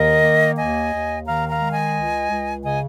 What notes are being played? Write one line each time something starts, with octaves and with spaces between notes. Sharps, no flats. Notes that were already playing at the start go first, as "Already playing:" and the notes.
Already playing: D#2 D#3 A#4 D#5
A#3
D#2 D#5 G#5
D#2
D#3 F5 A#5
F5 A#5
G#3
D#5 G#5
C#2
C#2
C#3 D#5 G#5